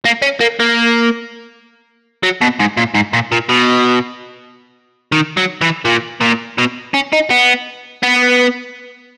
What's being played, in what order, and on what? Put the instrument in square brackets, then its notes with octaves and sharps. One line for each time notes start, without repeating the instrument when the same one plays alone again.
[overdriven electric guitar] A#3
C#4
A#3
A#3
F#3
B2
G#2
A#2
G#2
A#2
A#2
B2
D#3
F#3
E3
A#2
A#2
B2
C#4
D#4
B3
B3